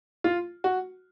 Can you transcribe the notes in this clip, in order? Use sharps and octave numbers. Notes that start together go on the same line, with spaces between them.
F4
F#4